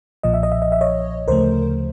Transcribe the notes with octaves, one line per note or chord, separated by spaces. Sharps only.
B1 A#2 F3 D#5
E5
D#5
E5
D#5
E5
C#5 D#5
D2 C#3 F3 A3 A#4 C5